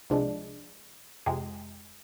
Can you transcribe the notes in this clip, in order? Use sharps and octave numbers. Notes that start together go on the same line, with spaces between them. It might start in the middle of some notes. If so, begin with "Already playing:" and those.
C2 C3 F3 G#3 D4
F2 C3 G#3